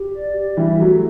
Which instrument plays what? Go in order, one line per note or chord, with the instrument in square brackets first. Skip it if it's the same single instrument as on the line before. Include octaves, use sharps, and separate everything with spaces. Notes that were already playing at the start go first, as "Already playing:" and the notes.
Already playing: [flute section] G4
D5
G4
[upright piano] E3 G3 [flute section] E5
[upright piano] F#3 A3 [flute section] E4